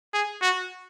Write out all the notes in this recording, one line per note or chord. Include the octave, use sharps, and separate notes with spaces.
G#4
F#4